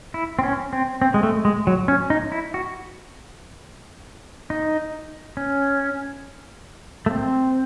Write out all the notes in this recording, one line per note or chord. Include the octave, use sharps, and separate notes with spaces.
E4
C4
C#4
C4
C4
G#3
A3
G#3
F#3
C#4
D#4
E4
F#4
D#4
C#4
A3
C4